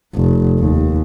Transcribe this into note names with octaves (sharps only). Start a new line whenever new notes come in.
F1
D#2